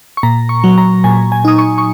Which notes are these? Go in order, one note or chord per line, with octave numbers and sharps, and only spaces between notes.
C#6
A#2 A#5
C#6
F#3
A#5
A#2 G#5
G#5
D#4 D#6
C#6
C#6